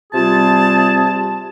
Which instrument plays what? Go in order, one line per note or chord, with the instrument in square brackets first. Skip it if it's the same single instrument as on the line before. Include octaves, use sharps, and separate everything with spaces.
[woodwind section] C3 G3 F4 G#4 A5